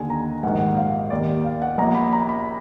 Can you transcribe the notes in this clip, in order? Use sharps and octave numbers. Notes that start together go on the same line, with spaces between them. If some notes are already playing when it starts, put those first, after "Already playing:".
Already playing: D#2 D3 G#5
A#5
A#1 G#2 D#3 F#5
F#5
F5
D#2 D#3 D5
F5
F#5
A#1 A#2 A#5
B5
A#5
B5